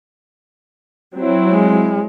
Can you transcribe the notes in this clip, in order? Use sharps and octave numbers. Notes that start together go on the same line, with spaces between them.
F#3 C4 E4
G#3